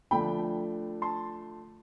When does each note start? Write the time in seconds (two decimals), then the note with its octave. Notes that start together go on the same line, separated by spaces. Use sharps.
0.11 D3 F3 A3 D4 G5 B5
1.02 A5 C6